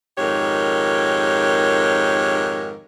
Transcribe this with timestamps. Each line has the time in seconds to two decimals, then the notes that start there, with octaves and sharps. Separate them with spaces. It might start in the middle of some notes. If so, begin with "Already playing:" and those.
0.18 F2 G#2 D#3 G4 A#4 C#5